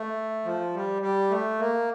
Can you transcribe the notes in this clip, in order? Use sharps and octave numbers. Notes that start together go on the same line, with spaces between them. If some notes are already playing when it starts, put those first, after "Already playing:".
Already playing: A3
F3
G3
G3
A3
A#3